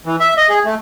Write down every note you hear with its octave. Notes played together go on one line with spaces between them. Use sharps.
E3
E5
D#5
G#4
A3